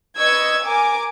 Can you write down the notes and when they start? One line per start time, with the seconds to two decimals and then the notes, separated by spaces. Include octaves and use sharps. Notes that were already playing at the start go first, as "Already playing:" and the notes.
0.18 B4 D#5 C#6 E6 G#6
0.64 A#4 G#5 D6